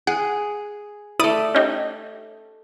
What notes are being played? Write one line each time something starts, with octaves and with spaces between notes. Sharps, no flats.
G#4 F#5
A3 E4 D5 D#6
C#4 D#4 G4